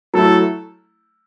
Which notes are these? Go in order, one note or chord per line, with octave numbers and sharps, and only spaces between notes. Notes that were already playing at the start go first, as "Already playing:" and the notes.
F#3 A3 E4 A4